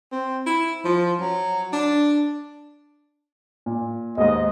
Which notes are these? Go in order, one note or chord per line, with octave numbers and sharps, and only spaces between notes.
C4
E4
F3
F#3
D4
A#2
D#2 G#2 D#5